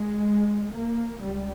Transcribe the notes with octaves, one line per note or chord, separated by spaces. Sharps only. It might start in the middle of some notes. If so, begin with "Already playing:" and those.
Already playing: G#3
A#3
C#2 G3